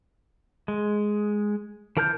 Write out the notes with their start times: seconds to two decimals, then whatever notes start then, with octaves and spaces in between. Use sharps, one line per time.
0.68 G#3
1.97 E3 A#4 A5 F6 G6